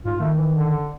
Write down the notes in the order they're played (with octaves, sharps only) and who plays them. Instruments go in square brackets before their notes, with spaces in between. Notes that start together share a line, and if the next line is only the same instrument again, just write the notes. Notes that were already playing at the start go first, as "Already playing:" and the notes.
[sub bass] G#2 [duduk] F4
[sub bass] D#3 [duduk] A3
[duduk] E3
D3